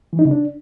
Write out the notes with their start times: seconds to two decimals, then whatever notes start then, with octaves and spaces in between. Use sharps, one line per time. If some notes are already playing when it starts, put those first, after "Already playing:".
0.13 E3
0.19 D#4
0.25 C#3
0.31 D4